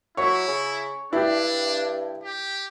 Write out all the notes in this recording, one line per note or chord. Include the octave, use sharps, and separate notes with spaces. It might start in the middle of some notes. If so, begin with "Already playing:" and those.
F#3 E4 C#5
C#3
G2 D4 E4 G4
G4